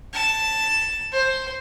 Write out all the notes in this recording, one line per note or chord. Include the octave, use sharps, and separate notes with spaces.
A5
C5